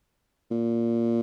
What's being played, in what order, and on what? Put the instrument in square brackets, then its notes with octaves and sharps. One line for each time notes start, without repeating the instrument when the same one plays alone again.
[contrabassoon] A#2